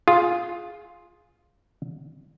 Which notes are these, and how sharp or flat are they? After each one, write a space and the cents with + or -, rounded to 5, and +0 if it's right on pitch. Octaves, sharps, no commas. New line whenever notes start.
F4 +0 G#4 +0